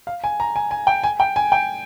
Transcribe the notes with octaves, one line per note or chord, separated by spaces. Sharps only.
F5
G#5
A#5
G#5
G#5
G5
G#5
G5
G#5
G5